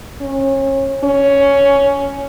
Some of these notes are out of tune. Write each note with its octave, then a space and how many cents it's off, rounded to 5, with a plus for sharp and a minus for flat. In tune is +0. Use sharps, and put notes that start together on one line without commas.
C#4 -30
C#4 +10